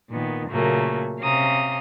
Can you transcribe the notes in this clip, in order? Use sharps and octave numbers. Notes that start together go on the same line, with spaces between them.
A#2 D#3 B3
A#2 C#3 F#3 A3 A#3
C3 C#4 F5 A#5 C6 D#6